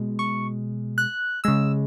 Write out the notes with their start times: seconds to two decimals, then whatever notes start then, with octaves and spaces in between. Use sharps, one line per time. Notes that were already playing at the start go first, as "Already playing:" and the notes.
Already playing: B2 G#3
0.19 C#6
0.98 F#6
1.44 C#3 G#3 E6